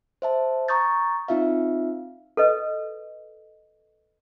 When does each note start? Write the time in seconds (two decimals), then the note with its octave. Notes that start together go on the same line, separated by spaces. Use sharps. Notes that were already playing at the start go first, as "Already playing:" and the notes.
0.22 C5 E5 A5
0.68 A#5 C#6 D#6 G6 A6
1.28 C4 D#4 F4 E5 F5
2.37 A4 B4 D#5